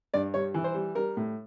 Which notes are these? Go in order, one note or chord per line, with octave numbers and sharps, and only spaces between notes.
G2 D5
G3 C#5
E3
C5
G3
G3 A#4
A2